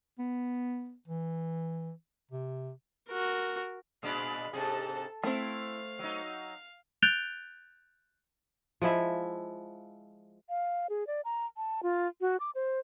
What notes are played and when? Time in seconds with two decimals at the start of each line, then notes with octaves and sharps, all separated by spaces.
0.19 B3
1.08 E3
2.31 C3
3.09 F#4 A#4
4.03 A#2 G#3 D4 F5 B5
4.53 G#2 C3 G#4 A4 A5
5.23 A3 C4 E4 F5
5.99 F#3 D#4
7.02 F#6 G6 A6 D7 F7 G7
8.82 F3 G#3 E4 E5
10.49 F5
10.90 G#4
11.07 D5
11.25 A#5
11.57 A5
11.83 F4
12.21 F#4
12.40 D6
12.55 C5